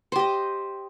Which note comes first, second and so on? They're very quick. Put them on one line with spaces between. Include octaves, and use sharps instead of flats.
C5 G4 D#5